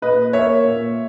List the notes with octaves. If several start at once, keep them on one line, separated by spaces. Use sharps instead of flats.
A#2 B4 D#5
A#3 C#5 E5
A#2